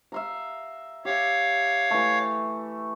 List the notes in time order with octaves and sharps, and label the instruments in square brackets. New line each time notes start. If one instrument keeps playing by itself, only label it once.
[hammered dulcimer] E5 F5 A#5
[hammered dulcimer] G4 E5 [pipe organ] C#5 F5
[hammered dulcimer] E3 A3